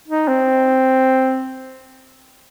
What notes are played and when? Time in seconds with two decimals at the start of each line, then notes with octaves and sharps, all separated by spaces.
0.08 D#4
0.28 C4